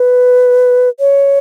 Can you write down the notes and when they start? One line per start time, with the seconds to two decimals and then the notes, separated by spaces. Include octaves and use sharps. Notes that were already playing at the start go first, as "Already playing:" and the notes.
Already playing: B4
1.00 C#5